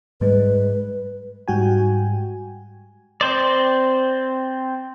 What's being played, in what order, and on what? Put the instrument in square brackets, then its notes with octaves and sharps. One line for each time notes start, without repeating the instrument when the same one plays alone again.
[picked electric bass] G#2 G3 G#3 [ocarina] B4
[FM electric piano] G#2 G3 F#4 G5 G#5
[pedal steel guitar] C4 C5 D5